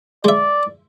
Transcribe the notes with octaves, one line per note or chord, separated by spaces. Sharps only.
G#3 D5 E5